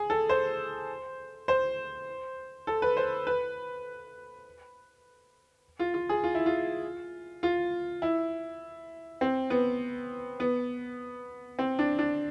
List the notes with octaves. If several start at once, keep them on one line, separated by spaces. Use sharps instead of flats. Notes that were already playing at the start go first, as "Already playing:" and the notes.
Already playing: G#4
A4
C5
C5
A4
B4
C5
B4
F4
F4
G#4
F4
E4
F4
F4
E4
C4
B3
B3
C4
D4
D4